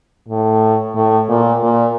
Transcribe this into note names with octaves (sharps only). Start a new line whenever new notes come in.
A2
A2
A#2
A#2